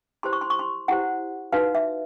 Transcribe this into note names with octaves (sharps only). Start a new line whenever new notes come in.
E4 G4 C5 C6
C#6
C6
C#6
C6
E4 G4 C5 F#5
D#4 F#4 B4 F5
E5